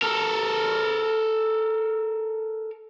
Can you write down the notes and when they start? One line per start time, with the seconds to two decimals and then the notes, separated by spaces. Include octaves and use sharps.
0.02 A4 A#4